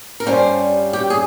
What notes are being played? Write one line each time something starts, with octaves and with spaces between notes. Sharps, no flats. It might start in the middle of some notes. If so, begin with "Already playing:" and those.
A#4
G2 G3 C#4 F4 C5
G4
G#4